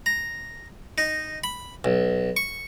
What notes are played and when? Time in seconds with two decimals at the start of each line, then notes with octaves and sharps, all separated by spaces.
0.06 A#5
0.98 D#4
1.44 B5
1.84 B1
2.37 C#6